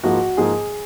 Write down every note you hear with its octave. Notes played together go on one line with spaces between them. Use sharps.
G#2 F3 A#3 F#4
G#2 F3 A#3 G#4